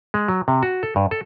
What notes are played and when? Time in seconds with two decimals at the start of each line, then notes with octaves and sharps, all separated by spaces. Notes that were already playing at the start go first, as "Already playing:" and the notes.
0.14 G#3
0.28 F#3
0.48 C3
0.63 F#4
0.83 A4
0.96 G2
1.11 A4